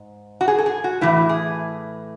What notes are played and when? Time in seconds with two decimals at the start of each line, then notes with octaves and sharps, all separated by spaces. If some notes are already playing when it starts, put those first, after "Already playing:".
Already playing: G#2
0.41 F#4
0.48 G#4
0.58 A4
0.66 G#4
0.84 F#4
1.01 A2 E3 E4
1.29 G#4